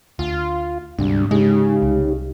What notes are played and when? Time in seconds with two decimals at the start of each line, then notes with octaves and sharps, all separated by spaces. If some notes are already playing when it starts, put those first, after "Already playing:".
0.19 D2 F4
0.99 D2 G#2 C3 G3 D4
1.31 C#3 G#3 D#4 G4
1.82 C2